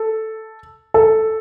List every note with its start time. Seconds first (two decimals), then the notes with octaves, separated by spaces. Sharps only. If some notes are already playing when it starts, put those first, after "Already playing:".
Already playing: A4
0.94 A4